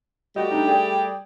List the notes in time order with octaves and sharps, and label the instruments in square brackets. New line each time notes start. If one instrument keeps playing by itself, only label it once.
[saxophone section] G3 A3 G4 [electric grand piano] F#4 D#5
[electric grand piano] D4 D#4
G#4 D5 G5